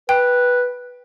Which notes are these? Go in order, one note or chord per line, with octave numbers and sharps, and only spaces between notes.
B4 G5